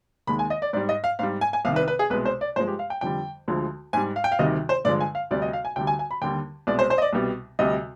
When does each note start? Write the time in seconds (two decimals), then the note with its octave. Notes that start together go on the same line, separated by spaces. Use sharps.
0.27 D#2 D#3 G#3 B5
0.39 G#5
0.50 D#5
0.62 D5
0.73 G#2 D5
0.77 G3
0.89 D#5
1.04 F5
1.19 G#2 G3 F5
1.41 G#5
1.53 G#5
1.65 C2 C3 D#3 F5
1.76 B4
1.88 B4
1.99 G#4
2.10 C2 B2 G#3 B4
2.25 C5
2.41 D5
2.56 G2 F3 G#3 C5
2.68 G4
2.79 F5
2.90 G5
3.01 F2 D3 G3 G5
3.48 D2 D3 F3 G#3
3.93 G#2 G3 G#5
4.16 F5
4.24 G5
4.32 F5
4.39 D2 C3 D#3 G3 D#5
4.69 C5
4.85 G2 D3 F3 G#3 D5
5.00 G#5
5.15 F5
5.31 D2 C3 G3 D5
5.42 D#5
5.53 F5
5.65 G#5
5.76 D2 D3 G3 G5
5.87 G#5
5.99 G#5
6.11 B5
6.22 D#2 D3 G3 G5
6.67 C2 B2 G#3 D5
6.79 C5
6.90 C5
6.98 D#5
7.02 D5
7.13 C2 B2 G3
7.59 D2 C3 G3 D#5